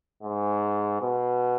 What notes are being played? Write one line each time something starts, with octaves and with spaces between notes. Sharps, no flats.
G#2
B2